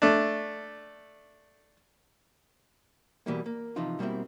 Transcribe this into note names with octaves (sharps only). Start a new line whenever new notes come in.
A3 D4
B2 E3 G3 A#3
A#3
C3 E3 F3 D#4 F4
B2 G3 A#3 C4 E4